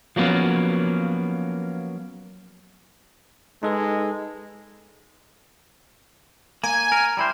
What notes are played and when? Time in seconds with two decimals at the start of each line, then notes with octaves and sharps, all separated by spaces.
0.16 F3 F#3 A#3 B3 C#4
3.63 G#3 D#4 A4 B4
6.64 A#3 G#5
6.92 A#4
7.17 G3 E4 C5